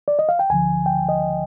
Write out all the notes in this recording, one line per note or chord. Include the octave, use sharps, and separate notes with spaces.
D5
D#5
F5
G5
D2 D3 F3 G#5
G5
D#5